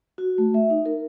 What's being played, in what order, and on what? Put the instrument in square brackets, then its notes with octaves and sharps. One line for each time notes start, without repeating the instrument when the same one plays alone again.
[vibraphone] F#4
A3
E5
D#4
A#4